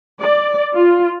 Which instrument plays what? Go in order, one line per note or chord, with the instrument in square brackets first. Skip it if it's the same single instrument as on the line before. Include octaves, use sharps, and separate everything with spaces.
[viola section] D5
F4